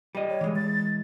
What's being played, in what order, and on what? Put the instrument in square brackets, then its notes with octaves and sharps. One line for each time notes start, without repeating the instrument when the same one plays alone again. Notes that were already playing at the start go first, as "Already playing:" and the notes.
[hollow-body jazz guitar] G3 D#5
[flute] C#5
[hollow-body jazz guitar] E3 G#3
[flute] A6